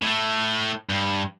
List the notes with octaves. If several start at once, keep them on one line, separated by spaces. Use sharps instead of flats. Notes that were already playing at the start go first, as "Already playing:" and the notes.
A2 A3
G2